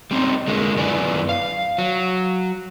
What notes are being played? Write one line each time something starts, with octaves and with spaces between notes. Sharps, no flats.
G3 C4 C#4 D#4
D3 G#3 A#3
F#2 B3 E4 B4 D5 G#5
F5
F#3